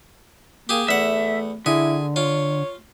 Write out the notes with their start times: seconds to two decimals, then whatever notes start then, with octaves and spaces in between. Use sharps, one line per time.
0.69 A#3 G4 G#4
0.88 E2 A3 E5 F#5
1.66 D3 E4 G#4
2.16 F4 C#5